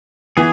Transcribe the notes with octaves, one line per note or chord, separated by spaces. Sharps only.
E3 B3 G#4